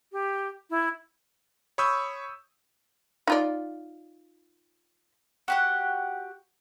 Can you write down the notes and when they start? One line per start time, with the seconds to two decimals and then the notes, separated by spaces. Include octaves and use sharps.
0.12 G4
0.70 E4
1.78 C#5 B5 C#6 D#6 E6 G6
3.27 D#4 F4 D5
5.48 F#4 G4 F#5